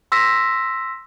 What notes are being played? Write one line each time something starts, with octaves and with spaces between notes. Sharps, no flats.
C6 E6 A#6 B6